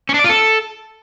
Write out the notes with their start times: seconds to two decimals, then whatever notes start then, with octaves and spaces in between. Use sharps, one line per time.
0.09 C#4
0.14 D4
0.19 D5
0.24 F4
0.29 A4